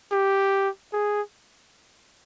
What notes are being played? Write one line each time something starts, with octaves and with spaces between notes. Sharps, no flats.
G4
G#4